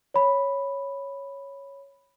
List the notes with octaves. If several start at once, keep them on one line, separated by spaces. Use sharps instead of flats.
C#5 B5